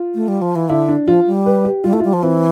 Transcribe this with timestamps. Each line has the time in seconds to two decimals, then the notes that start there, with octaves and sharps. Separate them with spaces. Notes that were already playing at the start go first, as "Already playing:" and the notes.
Already playing: F4
0.15 A3
0.28 G3
0.42 F3
0.56 E3
0.69 D3 E4
0.88 D4
1.07 F3 F4
1.27 G3
1.46 B4
1.65 G4
1.84 G3 F4
1.92 A3 E4
2.00 G3 F4
2.13 F3
2.22 E3 C4